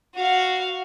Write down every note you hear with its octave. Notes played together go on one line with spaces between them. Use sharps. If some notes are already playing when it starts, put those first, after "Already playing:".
F#4 F5